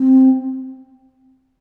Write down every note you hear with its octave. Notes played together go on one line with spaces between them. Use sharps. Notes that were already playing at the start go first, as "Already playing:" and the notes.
Already playing: C4